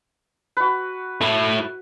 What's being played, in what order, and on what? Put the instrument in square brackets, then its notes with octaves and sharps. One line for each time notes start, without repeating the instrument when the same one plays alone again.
[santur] F#4 B4
[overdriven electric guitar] A3 E4